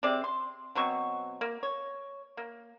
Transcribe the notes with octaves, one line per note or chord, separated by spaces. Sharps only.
C3 C4 G#4 D5
C6
B2 F#3 C4 C#6
A#3
C#5
A#3